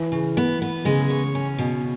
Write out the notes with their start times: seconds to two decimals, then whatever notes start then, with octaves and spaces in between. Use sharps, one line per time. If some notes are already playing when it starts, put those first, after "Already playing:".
Already playing: E3
0.12 C#3
0.37 B3
0.62 B3
0.85 C#3 G#3
1.10 C#5
1.35 C#4
1.58 B2